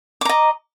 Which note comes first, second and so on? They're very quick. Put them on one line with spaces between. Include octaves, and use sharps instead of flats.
D6 A#5 D#5